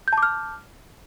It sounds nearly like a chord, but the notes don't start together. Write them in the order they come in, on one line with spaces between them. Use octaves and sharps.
G6 A5 D6 F6